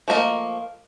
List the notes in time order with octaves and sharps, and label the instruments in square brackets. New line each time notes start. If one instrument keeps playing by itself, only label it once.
[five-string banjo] F3 A3 A#3 D#5